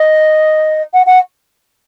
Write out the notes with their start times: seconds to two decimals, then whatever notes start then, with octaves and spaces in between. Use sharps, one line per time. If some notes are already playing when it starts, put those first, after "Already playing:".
Already playing: D#5
0.93 F#5
1.06 F#5